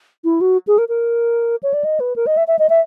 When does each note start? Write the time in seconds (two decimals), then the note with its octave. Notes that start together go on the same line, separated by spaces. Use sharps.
0.24 E4
0.41 F#4
0.67 G#4
0.78 A#4
0.89 A#4
1.63 C#5
1.74 D5
1.84 D#5
2.00 B4
2.16 A#4
2.27 D#5
2.37 E5
2.48 E5
2.59 D#5
2.69 E5